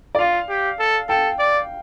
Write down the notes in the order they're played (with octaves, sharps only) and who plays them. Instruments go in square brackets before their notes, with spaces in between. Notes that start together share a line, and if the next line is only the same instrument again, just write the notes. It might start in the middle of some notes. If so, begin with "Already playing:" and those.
[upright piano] D5
[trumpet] F4 [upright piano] F5
[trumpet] G4
A4
[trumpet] A4 [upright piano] G5
[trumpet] D5